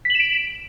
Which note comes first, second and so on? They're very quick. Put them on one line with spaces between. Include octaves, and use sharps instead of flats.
B6 F#7 E7 D7